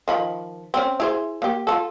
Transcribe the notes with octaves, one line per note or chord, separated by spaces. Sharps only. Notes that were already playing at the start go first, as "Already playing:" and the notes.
D#3 F3 B5
C4 C#4
E4 G#4 C5
A#3 G4
F4 F#4 A4